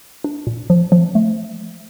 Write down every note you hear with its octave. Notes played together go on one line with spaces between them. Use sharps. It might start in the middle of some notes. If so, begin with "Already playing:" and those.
D4
A#2
F3
F3
A3